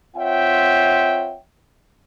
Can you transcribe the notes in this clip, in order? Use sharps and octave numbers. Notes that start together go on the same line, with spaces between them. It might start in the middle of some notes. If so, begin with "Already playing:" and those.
C4 F4 C#5 E5 F#5 G5